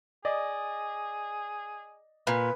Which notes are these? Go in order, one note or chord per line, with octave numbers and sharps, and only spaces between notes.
G#4 D5 D#5
A#2 B4